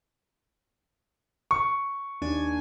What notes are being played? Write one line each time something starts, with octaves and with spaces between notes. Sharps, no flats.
C#6
D#2 D4 G#5